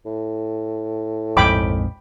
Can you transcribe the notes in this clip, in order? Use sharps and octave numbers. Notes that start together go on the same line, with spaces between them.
A2
A#1 F2 G#2 G5 B5 D6